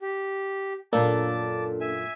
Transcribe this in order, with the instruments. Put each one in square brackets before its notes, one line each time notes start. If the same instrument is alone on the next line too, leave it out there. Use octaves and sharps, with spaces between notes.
[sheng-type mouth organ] G4
[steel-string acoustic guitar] F#2 A#2 [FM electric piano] A#3 D4 A4 [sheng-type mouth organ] A5 D6
[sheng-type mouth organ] E5 G#5